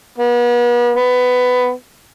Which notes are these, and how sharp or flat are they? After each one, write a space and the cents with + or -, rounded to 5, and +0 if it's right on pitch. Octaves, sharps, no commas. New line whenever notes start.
B3 -40
B3 +15